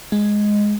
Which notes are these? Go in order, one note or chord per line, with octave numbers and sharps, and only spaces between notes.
G#3